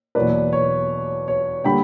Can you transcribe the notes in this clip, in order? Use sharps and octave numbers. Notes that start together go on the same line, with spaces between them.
E2 B2 F#3 A#3 B4 D5
C#5
C#5
D3 G3 A#3 G5 B5